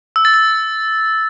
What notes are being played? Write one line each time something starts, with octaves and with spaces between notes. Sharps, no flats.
E6
A6
E6